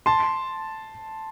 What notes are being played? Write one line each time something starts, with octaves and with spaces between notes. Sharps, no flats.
A5 C6